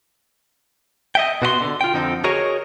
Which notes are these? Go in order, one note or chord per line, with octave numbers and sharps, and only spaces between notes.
D#5 E5 G5
B2 F#4 D#5 C6
D3
F4 G5
F2 D3 F3 C4 D#4
F#4 G#4 A#4 C#5 D#5